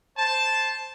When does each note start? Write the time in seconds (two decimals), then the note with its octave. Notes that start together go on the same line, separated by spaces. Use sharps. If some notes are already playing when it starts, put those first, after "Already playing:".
0.18 C5 A5